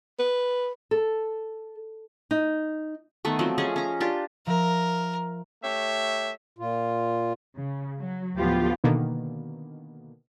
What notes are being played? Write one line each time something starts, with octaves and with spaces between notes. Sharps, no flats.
B4
A4
D#4
D#3 A3 B3
F3 F#3 C4
A3 C#4 G#4 D#5
C#4 A#5
D4 F4 G4
F3 A#4 E5 A#6
A3 G4 C#5 E5
A#2 F4
C#3
F#3
D2 A2 F3 B3 F4 G4
B2 D3 D#3 A#3 B3